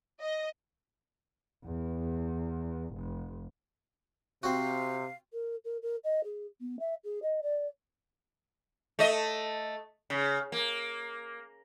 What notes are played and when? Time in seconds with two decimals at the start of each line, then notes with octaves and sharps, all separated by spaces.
0.22 D#5
1.64 E2
2.95 F1
4.43 C3 C4 F#4 F5
5.33 A#4
5.64 A#4
5.82 A#4
6.04 D#5
6.24 G#4
6.61 B3
6.79 E5
7.04 G#4
7.22 D#5
7.42 D5
8.99 A3 D#5
10.10 C#3
10.52 A#3